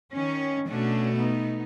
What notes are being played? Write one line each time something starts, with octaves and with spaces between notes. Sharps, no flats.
D#3 C#4
B2 A3 C#4 D4 F#4
B3 D#4